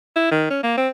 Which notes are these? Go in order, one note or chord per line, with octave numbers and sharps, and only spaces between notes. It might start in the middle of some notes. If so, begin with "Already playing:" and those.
E4
D#3
C#4
A#3
C4